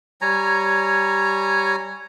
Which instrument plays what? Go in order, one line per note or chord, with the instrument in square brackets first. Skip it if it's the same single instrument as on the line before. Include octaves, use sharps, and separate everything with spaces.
[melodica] G3 C#5 G#5 A#5